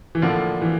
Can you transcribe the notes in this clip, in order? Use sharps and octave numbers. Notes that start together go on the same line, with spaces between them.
E3
A2 D3 F3 A#3 D4 F4
E3